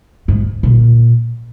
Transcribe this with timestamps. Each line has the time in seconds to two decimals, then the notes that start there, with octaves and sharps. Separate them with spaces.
0.28 G#2
0.63 A#2